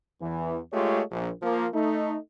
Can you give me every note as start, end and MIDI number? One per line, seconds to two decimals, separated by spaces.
0.21 0.59 40
0.21 0.59 52
0.73 1.01 56
0.73 1.01 57
0.73 1.01 65
0.73 1.01 67
0.73 1.01 73
1.12 1.30 34
1.42 1.68 53
1.42 1.68 58
1.73 2.16 57
1.73 2.16 63